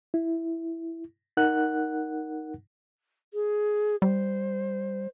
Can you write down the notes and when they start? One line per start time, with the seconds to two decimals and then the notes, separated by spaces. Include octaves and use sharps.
0.14 E4
1.37 D#4 A#4 F#5 F#6
3.34 G#4
4.02 G3 C5